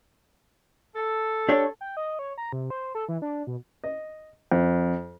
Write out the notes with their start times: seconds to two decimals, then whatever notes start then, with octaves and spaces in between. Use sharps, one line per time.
0.96 A4
1.49 D4 G4 C#5
1.81 G5
1.97 D#5
2.19 C#5
2.38 A#5
2.53 C3
2.70 C5
2.95 A4
3.09 E3
3.22 D4
3.47 B2
3.84 D#5
4.52 F2